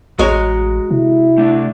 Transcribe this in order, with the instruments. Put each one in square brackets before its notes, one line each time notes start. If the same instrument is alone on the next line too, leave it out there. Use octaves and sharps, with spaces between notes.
[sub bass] A1 [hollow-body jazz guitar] G#3 C#5 [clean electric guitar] F#4 A#5
[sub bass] C3 [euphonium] E4
[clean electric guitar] A3 D4 E5